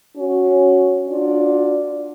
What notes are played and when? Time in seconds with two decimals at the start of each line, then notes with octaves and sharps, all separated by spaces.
0.17 C#4 F#4
1.08 D4 F4 F#4 D5